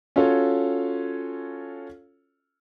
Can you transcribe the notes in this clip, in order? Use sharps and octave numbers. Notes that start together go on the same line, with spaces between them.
C#4 F4 F#4 A4 C#5